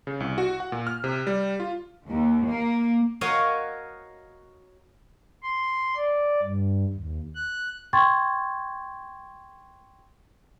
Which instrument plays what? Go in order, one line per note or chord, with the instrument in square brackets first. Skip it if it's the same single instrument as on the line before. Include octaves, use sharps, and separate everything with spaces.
[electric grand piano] C#3
C2
F#4
F#5
A#2
F6
C3
G3
F4
[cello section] D#2
A#3
[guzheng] F#4 A#4 C#5 D#5 F5
[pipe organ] C6
D5
G2
D#2
F#6
[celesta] G5 C6 C#6 G#6 A6